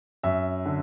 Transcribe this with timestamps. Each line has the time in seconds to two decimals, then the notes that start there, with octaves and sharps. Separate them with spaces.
0.23 F#2 E5
0.65 D3